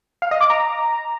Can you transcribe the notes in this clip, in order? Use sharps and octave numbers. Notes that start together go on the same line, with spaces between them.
F5
D#5
D6
A#5